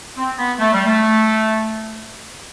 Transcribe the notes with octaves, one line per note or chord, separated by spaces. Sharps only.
C4
B3
A3
G3
A3